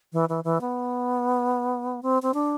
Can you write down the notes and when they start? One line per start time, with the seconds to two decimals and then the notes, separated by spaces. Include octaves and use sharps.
0.13 E3
0.29 E3
0.44 E3
0.61 B3
2.03 C4
2.22 C4
2.34 D4